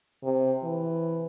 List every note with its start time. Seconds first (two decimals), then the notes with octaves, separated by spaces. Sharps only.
0.23 C3
0.63 E3